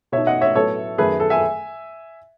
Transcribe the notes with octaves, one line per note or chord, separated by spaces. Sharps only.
B2 A3 D#4 C#5 E5
D#5 F#5
C#5 E5
A2 F#3 B3 A4 C#5
F#2 D#3 A3 G#4 B4
A4
E5 G#5